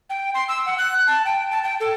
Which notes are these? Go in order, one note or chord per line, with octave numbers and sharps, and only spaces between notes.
G5
C6
E6
F#5
F#6
A5
G5
A5
G5
A4